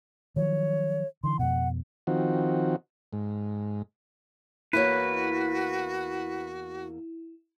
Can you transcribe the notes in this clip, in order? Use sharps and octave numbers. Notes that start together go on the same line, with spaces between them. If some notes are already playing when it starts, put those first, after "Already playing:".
D#3 F3 F#3 C#5
D3 E3 C6
F2 B2 F#5
D#3 F3 C4 F#4
G#2
E2 A#3 E4 F#4 B4 C#5